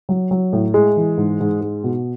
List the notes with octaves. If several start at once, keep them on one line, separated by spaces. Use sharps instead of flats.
F#3
F#3
A2
G#3
E3
G#2
G#2
G#3
B2